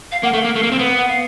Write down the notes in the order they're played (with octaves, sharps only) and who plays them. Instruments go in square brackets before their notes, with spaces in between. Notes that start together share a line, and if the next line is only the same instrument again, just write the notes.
[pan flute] F5
[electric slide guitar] A#3 [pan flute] F#5
[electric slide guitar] A3
[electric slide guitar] A#3 [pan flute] F5
[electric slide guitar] A3
A#3
C4
B3
[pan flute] F#5
F5